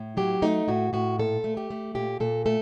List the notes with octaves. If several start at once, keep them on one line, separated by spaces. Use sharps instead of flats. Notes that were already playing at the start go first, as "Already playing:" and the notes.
Already playing: A2
F#3 G4
A3 D#4
A2 F#4
A2 F#4
A#2 A4
A3
G4
A3
A#2 G4
A#2 A4
A3 A4